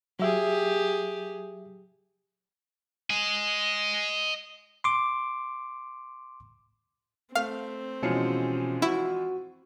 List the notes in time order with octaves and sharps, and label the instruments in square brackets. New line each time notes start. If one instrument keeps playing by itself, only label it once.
[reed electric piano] F#3 E5 [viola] G4 G#4
[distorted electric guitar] D#5 G#5
[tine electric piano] C6 D6
[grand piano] A3 [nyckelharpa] C4 [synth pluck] F5
[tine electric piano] B2 C#4 C#7 [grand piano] E3 F3 G#3
[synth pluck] E4 [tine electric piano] F#4